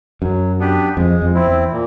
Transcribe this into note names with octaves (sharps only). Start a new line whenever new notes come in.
F#2 F#3
B3 D4 G4 B4
F2 G#3
F2
C4 E4
E2
A#2